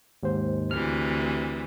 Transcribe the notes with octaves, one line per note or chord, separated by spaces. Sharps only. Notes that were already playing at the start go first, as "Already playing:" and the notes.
D#2 G#2 C5
D2 C3 E3 F6